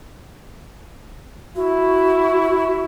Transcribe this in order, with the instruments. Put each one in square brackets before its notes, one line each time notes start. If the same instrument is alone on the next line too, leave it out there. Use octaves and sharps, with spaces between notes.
[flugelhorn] E4 [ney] F#4